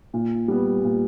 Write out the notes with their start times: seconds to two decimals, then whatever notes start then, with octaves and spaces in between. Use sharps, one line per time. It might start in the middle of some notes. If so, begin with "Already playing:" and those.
0.14 A#2
0.48 G3 B3
0.84 A#2